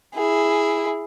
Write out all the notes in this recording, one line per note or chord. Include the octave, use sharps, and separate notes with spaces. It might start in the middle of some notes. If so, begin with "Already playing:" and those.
E4 G#4